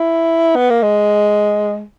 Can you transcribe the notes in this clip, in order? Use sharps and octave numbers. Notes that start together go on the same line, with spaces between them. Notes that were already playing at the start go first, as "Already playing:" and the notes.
Already playing: E4
B3
A#3
G#3